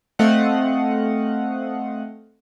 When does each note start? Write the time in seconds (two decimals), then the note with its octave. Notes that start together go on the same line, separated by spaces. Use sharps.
0.19 A3 C4 D#5 F5 F#5